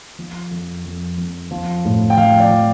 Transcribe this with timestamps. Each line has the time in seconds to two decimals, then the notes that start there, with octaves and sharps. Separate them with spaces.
0.19 F3
0.51 F2
0.85 F2
1.18 F2
1.51 F3
1.85 A2
2.10 G5
2.17 F3 F5
2.40 D5
2.50 F3